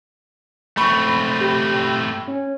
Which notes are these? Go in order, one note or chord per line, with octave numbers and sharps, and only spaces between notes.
A3 C4 B5 C#6
G4
C#4